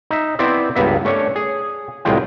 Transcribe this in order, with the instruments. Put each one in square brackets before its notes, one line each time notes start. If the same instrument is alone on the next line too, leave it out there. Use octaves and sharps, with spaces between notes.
[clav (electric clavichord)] D#4 E5
B3 C4 E4 C5 D5 E5
C#2 G2 A#3 B3 E5
A3 C#4 D4 C#5
G#4
C2 A2 G#3 F4 G5